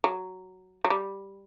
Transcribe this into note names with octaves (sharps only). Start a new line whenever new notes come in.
F#3
F#3
G3